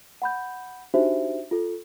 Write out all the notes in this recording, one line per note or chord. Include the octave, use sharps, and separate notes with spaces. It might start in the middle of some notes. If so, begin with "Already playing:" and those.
F#5 B5 G6
D4 D#4 F#4 G4 C5 E5
F4 A4